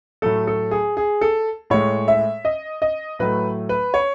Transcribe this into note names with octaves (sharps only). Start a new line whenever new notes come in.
A2 F#3 A3 A4
A4
G#4
G#4
A4
A2 G#3 C#5
E5
D#5
D#5
A2 F#3 A3 B4
B4
C#5